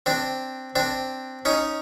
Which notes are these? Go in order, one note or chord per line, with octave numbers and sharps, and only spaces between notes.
C4 D4
C4 D4
C#4 D#4